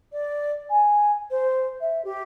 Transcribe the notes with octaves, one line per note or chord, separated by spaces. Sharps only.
D5
G#5
C5
E5
G4